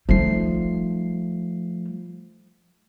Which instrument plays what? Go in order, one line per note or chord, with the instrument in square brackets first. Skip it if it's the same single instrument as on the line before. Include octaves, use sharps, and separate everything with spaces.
[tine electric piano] F3 A3 C7 [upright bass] G3 D#4